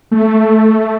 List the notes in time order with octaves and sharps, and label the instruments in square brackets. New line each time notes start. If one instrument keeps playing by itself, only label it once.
[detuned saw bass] A3